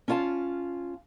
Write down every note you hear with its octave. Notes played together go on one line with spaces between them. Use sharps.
C#4 E4 F4 F5 A5